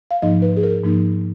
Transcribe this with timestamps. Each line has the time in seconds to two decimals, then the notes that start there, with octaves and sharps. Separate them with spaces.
0.11 F5
0.22 G#2 F3 A#3 D#4 D#5
0.42 B4
0.57 G#4
0.63 A#4
0.84 G#2 F3 A#3 D#4